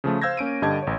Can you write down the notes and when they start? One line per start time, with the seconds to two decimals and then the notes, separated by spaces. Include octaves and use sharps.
0.04 C#3 F3 A3
0.22 C5 F5 E6 G6 G#6 A#6
0.37 A#3 C#4 D7 D#7
0.62 G2 D3 G4 D#5 A5 G#6
0.83 A1 C#5